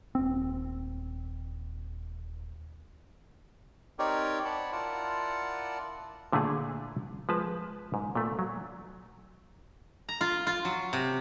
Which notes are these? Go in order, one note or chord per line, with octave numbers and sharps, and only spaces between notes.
D#1 C4
C4 D#4 G4 A#4 C#5 D5
C#5 D5 F#5 A5 B5
E4 F4 A#4 D5 F#5 A5
A#2 D3 A3 E4 G#4
F3 G#3 B4 A5
G#2
A#2 A3
F#3
A#5
F4
F4
F#3
C3